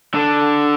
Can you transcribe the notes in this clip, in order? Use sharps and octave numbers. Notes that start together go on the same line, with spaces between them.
D3